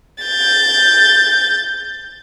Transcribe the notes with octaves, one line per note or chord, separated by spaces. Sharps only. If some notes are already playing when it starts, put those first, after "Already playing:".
G6 A6